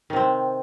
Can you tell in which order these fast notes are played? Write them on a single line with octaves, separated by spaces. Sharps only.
D#3 C3 C4